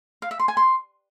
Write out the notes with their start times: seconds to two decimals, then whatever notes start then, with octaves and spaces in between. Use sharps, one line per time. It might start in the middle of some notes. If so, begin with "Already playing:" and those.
0.22 F5
0.31 E5
0.40 C6
0.48 G#5
0.57 C6